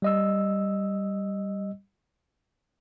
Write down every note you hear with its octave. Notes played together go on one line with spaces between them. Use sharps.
G3 D#5 E6